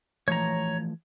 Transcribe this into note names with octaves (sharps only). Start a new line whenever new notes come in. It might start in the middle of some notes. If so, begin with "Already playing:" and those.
E3 F3 A3 C#5 A#5